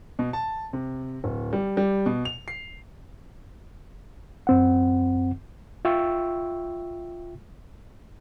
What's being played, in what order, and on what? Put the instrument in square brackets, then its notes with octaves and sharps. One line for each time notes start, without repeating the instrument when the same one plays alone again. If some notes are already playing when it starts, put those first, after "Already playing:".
[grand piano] B2
A5
C3
D1
G3
G3
B2
F7
C7
[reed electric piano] F#2 C4 F#5
F4 E5 G5 C#6 E6